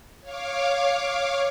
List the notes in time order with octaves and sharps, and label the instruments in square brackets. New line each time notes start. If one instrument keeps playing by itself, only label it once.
[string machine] C#5 F5 D6